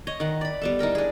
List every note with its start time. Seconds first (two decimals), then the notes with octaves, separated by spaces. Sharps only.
0.07 C#5 D#5
0.20 D#3 F#5
0.41 D5 B5
0.61 G3 B3 A4
0.79 D#4 E4 A#4 G5
0.95 D4 G#4